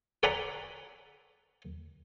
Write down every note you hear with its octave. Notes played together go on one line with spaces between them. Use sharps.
A4 D5 F#5 G#5 A#5 B5